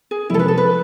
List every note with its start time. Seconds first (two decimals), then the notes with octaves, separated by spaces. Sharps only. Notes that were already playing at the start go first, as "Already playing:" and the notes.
0.11 G#4
0.30 F1 F2 C3 E3 G#3 E4 A4
0.39 B4
0.48 A4
0.58 B4